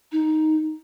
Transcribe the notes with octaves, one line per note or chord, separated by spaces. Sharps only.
D#4